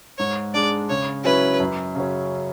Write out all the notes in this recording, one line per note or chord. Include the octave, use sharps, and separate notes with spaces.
G#2 C#5
G#3 D4 D5
C#3 C#5
F#3 C#4 E4 B4
F#2
C#3 F#3 C#4